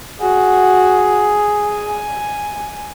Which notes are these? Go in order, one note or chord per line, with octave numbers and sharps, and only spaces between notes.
F#4 G#4
G#5